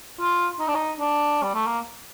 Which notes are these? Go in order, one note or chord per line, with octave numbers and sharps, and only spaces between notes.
F4
D#4
D4
D#4
D4
G3
A3
A#3